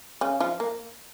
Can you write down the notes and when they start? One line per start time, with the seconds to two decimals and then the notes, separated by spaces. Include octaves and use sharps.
0.21 C#3 C#4
0.40 F3 F4
0.60 A#3